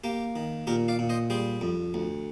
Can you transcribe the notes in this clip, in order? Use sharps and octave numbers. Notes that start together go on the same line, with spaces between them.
A#3 G4
D#3
A#2 G4 A#4
D5 F5
A#2
C5 D#5
G3 G#4 C5
F2
D2